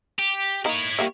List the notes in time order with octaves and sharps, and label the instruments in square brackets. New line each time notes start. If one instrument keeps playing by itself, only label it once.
[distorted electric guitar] G4
[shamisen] A#3 D#4 [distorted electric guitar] E4 C#5
[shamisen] G3 A#3 E5